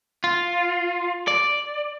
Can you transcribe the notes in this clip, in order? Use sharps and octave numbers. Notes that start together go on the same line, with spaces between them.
F4
D5